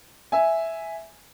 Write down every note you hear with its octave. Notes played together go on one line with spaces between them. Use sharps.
E5 G#5